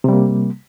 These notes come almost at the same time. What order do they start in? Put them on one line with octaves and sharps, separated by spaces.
C3 G3 A#3